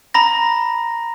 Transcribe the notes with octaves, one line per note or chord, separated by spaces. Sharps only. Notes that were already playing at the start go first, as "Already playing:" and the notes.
A#5 B5 A#6